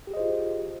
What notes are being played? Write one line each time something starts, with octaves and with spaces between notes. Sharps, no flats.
F4 G4 G#4 C5 D#5